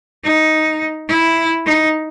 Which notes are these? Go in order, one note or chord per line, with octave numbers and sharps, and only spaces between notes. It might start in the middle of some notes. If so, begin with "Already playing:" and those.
D#4
E4
D#4